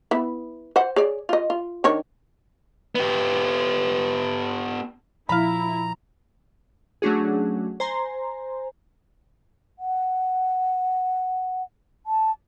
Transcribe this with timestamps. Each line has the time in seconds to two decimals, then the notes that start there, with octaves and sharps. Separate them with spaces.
0.11 B3 E4
0.76 C5 F#5
0.96 G#4 C#5 D5
1.29 F4 D#5
1.50 F4
1.84 D#3 D4 C#5
2.95 B3 G4
5.29 A#2 F3 E4 F5 A#5 B5
7.02 F#3 A3 C#4 D4 F#4 G#4
7.80 C5 G#5 A#5 C6
9.79 F#5
12.06 A5